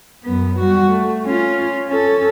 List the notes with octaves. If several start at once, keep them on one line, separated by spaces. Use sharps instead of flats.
F#2 B3
G3 F#4
A3
C#4 F4
C#4 A4